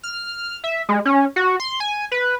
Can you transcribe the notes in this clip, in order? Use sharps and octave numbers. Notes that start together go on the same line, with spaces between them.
F6
E5
G#3
C#4
F#4
C6
G#5
B4